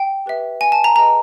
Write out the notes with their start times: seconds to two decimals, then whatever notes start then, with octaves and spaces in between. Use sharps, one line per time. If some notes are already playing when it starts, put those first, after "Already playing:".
Already playing: G5
0.26 G4 B4 E5
0.61 G#5
0.72 A5
0.84 A#5
0.96 G#4 B4 D#5 A#5